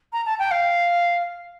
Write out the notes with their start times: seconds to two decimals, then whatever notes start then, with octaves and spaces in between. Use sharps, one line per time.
0.13 A#5
0.26 A5
0.39 G5
0.51 F5